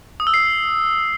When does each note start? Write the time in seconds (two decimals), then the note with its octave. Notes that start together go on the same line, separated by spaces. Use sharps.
0.20 D#6
0.27 E6
0.34 C7